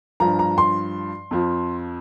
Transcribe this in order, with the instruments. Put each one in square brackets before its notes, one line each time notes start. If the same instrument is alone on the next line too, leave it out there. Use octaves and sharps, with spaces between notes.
[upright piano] G2 F3 A#5
A#5
C6
F2 F3